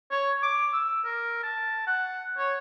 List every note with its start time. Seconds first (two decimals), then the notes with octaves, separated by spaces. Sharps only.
0.11 C#5
0.42 D6
0.73 E6
1.04 A#4
1.43 A5
1.87 F#5
2.37 C#5